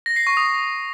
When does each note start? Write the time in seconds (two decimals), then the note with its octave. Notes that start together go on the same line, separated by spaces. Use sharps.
0.06 A#6
0.16 C7
0.27 C#6
0.37 D#6